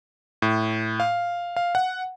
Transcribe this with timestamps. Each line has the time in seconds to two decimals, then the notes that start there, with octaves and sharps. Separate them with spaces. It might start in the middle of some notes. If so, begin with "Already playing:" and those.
0.42 A2
1.00 F5
1.56 F5
1.75 F#5